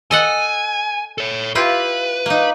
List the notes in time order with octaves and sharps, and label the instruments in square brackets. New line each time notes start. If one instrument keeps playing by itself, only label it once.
[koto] A4 D#5 F#5 [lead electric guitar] G#5
[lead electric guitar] A4 C#5
[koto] E4 F4 G4 [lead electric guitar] B4
[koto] A#3 D#4